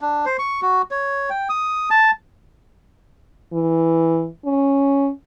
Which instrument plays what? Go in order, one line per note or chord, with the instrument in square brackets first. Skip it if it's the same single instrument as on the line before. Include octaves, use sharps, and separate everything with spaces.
[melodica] D4
C5
C#6
F#4
C#5
G5
D#6
A5
[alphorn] E3
C#4